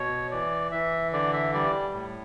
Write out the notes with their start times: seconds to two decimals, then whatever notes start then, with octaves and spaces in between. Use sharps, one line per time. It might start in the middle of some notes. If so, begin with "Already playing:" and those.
Already playing: B2 C#5
0.31 E3 D5
0.72 E3 E5
1.13 D3 D5
1.33 E5
1.53 G3 D5
1.94 A2